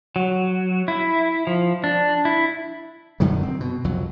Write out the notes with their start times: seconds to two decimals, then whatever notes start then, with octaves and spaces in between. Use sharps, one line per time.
0.16 F#3
0.88 E4
1.47 F3
1.84 D4
2.25 E4
3.20 F#2 D3 D#3 F#3
3.43 C4
3.60 B2
3.84 C2 F2 F#3